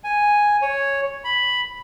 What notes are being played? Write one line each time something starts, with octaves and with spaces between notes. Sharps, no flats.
G#5
C#5
B5